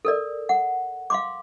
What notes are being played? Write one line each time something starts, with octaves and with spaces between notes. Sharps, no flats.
A4 A#4 D5
F#5
F5 C6 D6